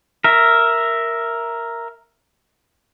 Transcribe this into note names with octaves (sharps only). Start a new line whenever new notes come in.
A#4 E5